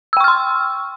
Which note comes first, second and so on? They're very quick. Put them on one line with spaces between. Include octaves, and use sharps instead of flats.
E6 G5 C#6 F6 C6